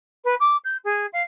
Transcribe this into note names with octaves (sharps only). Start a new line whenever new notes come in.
B4
D6
G6
G#4
F5